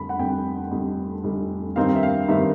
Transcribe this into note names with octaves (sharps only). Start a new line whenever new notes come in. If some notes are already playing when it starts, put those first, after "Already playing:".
Already playing: F1 F2 D3 G3 B5
F#5
F1 F2 D3 G3 G5
F1 F2 D3 G3
F1 F2 D3 G3
G2 D#3 G3 C4 D#4 F5
E5
F5
G2 D#3 G3 C4 D#4 E5